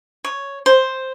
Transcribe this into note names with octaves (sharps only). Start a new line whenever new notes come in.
C#5
C5